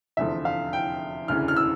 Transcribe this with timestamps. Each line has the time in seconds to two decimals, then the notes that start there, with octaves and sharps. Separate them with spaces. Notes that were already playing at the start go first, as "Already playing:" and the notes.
0.17 F1 E2 D3 F3 E5
0.45 F5
0.73 G5
1.28 E1 D2 C#3 E3 F6
1.48 F6
1.56 E6